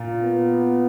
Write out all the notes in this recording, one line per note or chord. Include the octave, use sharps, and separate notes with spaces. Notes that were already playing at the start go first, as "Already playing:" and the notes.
Already playing: A#2
B3